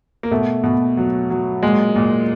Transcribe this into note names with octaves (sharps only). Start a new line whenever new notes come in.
A#3
B2 A3
B2
F#3
F#3
A#2 G#3
A#2